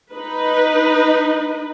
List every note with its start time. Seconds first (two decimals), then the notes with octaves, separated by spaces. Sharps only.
0.13 D#4 B4